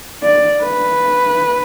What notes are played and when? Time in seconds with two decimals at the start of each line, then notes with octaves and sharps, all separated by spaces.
0.23 D5
0.62 B4